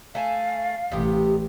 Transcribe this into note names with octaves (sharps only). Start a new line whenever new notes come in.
A3 F5 G#5 A5
A1 C3 B3 G4